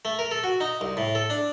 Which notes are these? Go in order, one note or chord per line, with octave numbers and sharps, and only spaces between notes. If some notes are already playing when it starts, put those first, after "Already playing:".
A3
A#4
A4
F#4
D#4
C2
A2
A4
D4